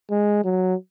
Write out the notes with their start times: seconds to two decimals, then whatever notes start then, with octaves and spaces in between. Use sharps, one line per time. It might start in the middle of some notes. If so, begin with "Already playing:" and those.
0.11 G#3
0.45 F#3